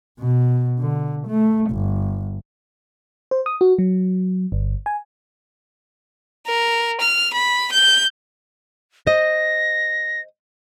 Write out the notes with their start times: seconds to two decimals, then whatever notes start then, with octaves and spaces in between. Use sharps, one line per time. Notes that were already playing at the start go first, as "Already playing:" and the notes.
0.19 B2
0.79 D3
1.27 A3
1.71 G1
3.31 C5
3.46 D#6
3.61 F#4
3.79 F#3
4.52 G1
4.86 G#5
6.47 A#4
7.01 F6
7.34 B5
7.73 G6
9.07 C5 D#5 A#6